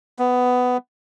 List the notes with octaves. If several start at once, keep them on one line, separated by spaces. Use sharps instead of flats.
B3